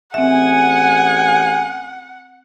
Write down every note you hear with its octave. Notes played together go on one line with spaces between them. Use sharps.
A1 C4 G#4 E5 F#5 G#5